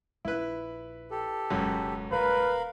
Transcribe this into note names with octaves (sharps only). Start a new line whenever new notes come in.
A#1 E4 B4
G4 A4
E1 C#2 F#2 B2
D#1 A#4 B4 F5 B5